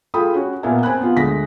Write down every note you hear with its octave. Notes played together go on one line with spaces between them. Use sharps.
F4 G#4 A4 G5 B5 D#6
C#4 F#4
A#2 B3 A#4 E5 G#5
C4 G#5 B5 F#6
B3 F4
D2 G#3 A#6 B6